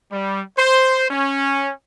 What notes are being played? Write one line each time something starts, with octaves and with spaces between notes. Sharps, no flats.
G3
C5
C#4